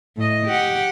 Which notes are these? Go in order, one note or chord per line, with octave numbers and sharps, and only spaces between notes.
A2 D#5
G4 F#5